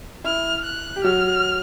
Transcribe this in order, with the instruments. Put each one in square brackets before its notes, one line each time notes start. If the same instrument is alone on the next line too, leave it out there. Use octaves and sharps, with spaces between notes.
[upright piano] E4 [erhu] F6
[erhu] F#6
[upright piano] G4
[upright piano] F#3 F#4 [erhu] F6